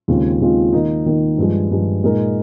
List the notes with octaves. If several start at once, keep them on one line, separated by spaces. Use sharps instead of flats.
D#2 C#3 G#3 C4 F4
D#2 C#3 G#3 C4 F4
D#3 A#3 D#4
D#3 A#3 D#4
G2 F3 G#3
G2 F3 G#3
A#2 G#3 D#4 A#4